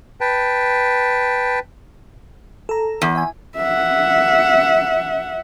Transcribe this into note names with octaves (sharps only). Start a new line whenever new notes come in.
B4 G5 A5
A4 A#5
E2
E5 G#5
E5 F#5